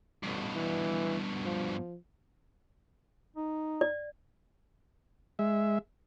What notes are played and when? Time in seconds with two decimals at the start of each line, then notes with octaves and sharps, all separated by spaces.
0.23 A1 G2 B2
0.55 E3
1.45 F3
3.36 D#4
3.81 D5
5.39 G#3 E5